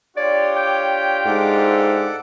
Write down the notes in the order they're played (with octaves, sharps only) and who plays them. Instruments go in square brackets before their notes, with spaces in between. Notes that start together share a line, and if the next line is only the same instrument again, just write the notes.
[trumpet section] D4 F4 G4 [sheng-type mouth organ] C#5 [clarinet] D5
[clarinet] G5
[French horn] G#2 [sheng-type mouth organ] A4 F#5 D6